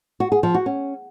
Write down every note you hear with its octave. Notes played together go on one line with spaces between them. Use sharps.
F#4
G#4
F3
F#4
C#4